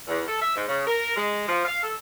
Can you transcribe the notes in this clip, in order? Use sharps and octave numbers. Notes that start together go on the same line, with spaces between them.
E2
A4
E5
G#2
C#3
A#4
G#3
F3
F5
A4